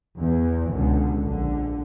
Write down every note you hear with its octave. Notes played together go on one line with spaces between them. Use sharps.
E2 E3
C#2 B2 D3
A#1 D3